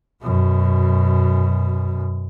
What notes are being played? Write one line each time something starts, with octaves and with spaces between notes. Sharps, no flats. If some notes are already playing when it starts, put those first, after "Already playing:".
F#2 B2